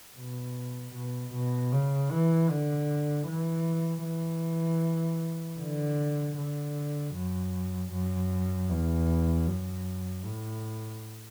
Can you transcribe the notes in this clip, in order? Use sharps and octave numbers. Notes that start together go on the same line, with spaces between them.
B2
B2
B2
C#3
E3
D3
E3
E3
D3
D3
F#2
F#2
E2
F#2
A2